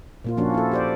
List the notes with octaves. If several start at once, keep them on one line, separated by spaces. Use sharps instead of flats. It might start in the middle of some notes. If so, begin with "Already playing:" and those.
A#2 A#3 F4
F3 A#3 C#4 D4 F#4
E4 A4
G4 C5 D5